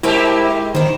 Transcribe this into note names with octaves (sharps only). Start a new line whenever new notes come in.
G#3 E4 G4 A#4 C5 G5
D#3 E4 C5